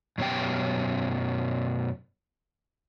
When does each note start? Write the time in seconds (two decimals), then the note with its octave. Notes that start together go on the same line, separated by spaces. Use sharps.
0.18 F#2 B2 C#4 G4 G5